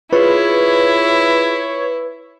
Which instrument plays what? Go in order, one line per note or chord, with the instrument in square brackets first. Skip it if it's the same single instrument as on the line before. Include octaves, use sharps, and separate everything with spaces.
[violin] E4 [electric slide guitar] F4 G#4 [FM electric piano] B4 [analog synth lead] C#5